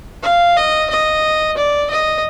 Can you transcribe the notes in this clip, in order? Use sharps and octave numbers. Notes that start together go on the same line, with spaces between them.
F5
D#5
D#5
D5
D#5